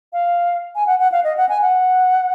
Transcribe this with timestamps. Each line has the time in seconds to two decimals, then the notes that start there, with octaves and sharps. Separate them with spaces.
0.13 F5
0.75 G#5
0.87 F#5
0.99 F#5
1.12 F5
1.24 D#5
1.37 F#5
1.49 G#5
1.62 F#5